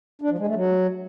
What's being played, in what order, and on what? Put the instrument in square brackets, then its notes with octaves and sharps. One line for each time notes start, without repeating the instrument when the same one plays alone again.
[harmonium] D4
F3
G#3
A3
F#3